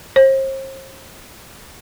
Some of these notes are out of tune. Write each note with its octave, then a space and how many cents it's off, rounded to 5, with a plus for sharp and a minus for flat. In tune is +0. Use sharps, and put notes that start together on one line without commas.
C5 +40